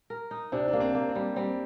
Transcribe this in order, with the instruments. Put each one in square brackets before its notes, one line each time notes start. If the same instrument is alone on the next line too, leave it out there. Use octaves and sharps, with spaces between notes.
[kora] A#4
D#4
[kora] C3 [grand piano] D4
[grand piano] D4
[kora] A#3
[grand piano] C4
[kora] A#3
[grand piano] C4
[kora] G3
[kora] G3 [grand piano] C4